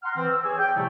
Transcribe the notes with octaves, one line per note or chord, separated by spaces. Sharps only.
F#5 A#5 C6 F6
E3 C4
E6
G#4 C#5 D5 G#5
G5
A2 C3 F3 G3 A3